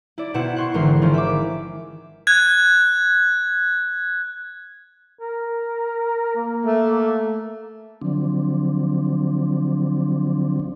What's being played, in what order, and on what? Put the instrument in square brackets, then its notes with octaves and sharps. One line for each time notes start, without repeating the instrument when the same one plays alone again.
[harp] E4 D5
B2 C4 E4 F#5 E7
F#5 C6 C#6
G#1 D3 E3 C6
D#3 F3 C4 C#4
E5 D6
[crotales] F#6 G#6
[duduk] A#4
A#3
[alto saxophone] A3
[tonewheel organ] D3 F3 F#3 C4 D4